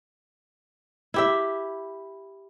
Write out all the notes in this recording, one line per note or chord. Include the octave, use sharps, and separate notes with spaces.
E4 G4 E5